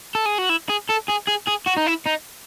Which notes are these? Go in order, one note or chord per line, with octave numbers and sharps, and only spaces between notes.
A4
G#4
F#4
E4
G#4
A4
G#4
G#4
G#4
F#4
D#4
E4
D#4